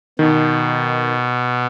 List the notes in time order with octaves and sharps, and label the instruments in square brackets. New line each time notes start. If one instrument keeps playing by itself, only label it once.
[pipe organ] B2 [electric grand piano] D#3